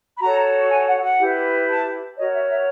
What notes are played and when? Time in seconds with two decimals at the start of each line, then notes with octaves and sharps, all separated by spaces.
0.16 B5
0.20 F#4 A4 C#5 A#5
0.69 G#5
0.86 F#5
1.02 F#5
1.18 E4 G4 B4
1.67 A5
2.16 F#4 A#4 C#5 D#5
2.32 E5
2.48 E5